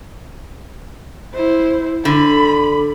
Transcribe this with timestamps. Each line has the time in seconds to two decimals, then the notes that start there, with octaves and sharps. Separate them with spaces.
1.35 E4 C5
2.05 D3 B5